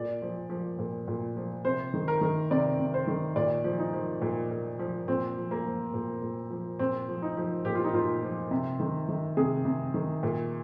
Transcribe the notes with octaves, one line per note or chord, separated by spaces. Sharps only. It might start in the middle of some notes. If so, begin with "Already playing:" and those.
Already playing: A#2 D5
F3
F3
A#2
A#2
F3
C3 C5
D#3
A#4
D#3
C3 D5
C3
C5
D#3
A#2 D5
F3
D#4
F3
A#2
A#2
F3
A#2 C4
F3
A#3
F3
A#2
A#2
F3
A#2 C4
F3
D#4
F3
A#2 G4
F4
D#4
A#2 F4
F3
C3
D#3
D#3
C3 G#4
C3
D#3
A#2